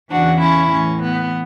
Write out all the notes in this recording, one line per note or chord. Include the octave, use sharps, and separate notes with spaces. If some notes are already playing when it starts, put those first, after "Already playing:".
E2 C#3 E3 D4 F#4
C#4 E4
A2 E3 C#4
B3